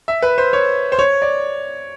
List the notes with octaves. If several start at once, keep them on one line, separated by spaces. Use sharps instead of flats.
E5
B4
C5
C#5
C5
C#5
D5